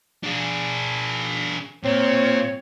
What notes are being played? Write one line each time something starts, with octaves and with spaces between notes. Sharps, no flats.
D4 G#4
A#2 C4 C#5